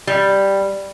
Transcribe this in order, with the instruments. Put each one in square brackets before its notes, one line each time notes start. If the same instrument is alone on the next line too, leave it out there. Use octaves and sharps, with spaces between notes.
[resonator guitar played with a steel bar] G3